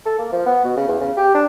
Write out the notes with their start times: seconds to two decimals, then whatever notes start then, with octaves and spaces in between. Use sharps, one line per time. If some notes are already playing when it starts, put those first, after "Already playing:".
0.06 A4
0.19 A#3
0.32 F3
0.46 B3
0.65 B2
0.77 C#3
0.88 E2
1.01 C#3
1.17 G4
1.35 D4